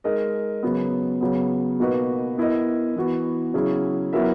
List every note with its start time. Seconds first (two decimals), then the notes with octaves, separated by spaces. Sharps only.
0.04 G#3 D#4 A#4 D#5
0.63 C#3 F#3 B3
1.21 C#3 F#3 B3
1.80 B2 A#3 D#4 F#4 B4
2.38 B3 E4 A#4 D#5
2.96 E3 B3 F#4
3.54 C#3 F#3 C#4 E4 G#4
4.13 F#3 B3 E4 A#4 E5